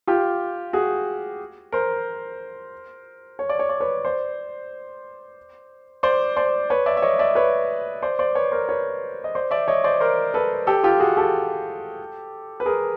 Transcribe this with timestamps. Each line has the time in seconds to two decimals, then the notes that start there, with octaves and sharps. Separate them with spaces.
0.07 F4 G4
0.73 F#4 G#4
1.72 A#4 C5
3.39 C#5
3.49 D5
3.59 C#5
3.69 D5
3.80 B4 C#5
4.05 C5 D5
6.03 C5 D5
6.37 C5 D5
6.70 B4 C#5
6.86 D5 E5
6.97 E5
7.02 C#5 D#5
7.19 D5 E5
7.35 B4 C#5
8.02 C5 D5
8.19 C5 D5
8.35 B4 C#5
8.51 A#4 C5
8.69 B4 C#5
9.24 D#5
9.35 C5 D5
9.51 D5 E5
9.68 C#5 D#5
9.84 C5 D5
10.00 A#4 C5
10.34 A4 B4
10.67 G4 A4
10.84 F4 G4
11.00 F#4 G#4
11.17 G4 A4
12.60 B4
12.66 G#4 A#4